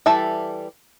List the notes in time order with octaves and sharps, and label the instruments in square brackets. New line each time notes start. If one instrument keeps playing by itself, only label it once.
[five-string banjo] E3 G3 A4 E5 A5